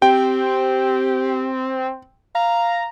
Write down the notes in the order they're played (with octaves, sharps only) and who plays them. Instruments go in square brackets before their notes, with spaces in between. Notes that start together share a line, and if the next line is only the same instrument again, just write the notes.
[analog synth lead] C4 [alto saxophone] G4 [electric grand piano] G5
[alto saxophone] F5 [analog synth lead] A#5